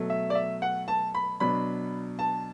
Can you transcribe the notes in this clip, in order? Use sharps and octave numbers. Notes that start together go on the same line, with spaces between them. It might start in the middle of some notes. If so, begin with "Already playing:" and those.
Already playing: B2 F#3 A3
E5
D5
E5
F#5
A5
B5
B2 F#3 D4 B5
A5